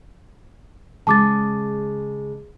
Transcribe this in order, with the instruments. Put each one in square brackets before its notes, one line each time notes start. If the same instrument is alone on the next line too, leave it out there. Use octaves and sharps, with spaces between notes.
[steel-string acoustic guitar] C#3 G#3 [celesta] A5 D6 A6